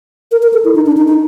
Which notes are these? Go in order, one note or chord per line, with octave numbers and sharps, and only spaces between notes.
A#4
A#4
A4
E4
D#4
D4
D#4
D#4